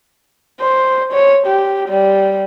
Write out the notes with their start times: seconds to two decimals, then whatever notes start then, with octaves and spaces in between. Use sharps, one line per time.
0.61 C5
1.13 C#5
1.47 G4
1.89 G3